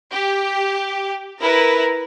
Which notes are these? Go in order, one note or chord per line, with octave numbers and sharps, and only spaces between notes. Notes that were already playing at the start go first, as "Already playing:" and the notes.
G4
E4 A#4 B4